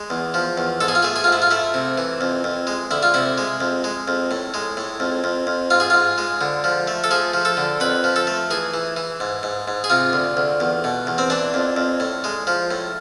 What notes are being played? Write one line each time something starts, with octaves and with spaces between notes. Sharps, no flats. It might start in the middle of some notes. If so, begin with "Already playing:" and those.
Already playing: G#3
E2
F3
E2
G#2 A4
G#4
F4
A3 G#4
G#4
G#2 F4
E4
F4
A3 E4
C3
E3
F2
F2
G#3
D2 E4
F4
C3 E4
G#3
F2
G#3
F2
A2
G#3
A2
F2
F2
F2
G#2 F4
G#4
G#2 F4
G#3
D3
F3
A3
A4
F3 G#4
F3
A4
D3
F2 B4
F3
A4
A3
E3 G#4
E3
E3
G#2
G#2
G#2
G#4
C3 F4
D2
D2
E2
B2
E2
C4
E3 D4
F2
F2
A2
G#3
F3
A2